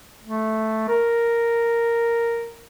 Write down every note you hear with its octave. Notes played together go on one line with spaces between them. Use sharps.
A3
A#4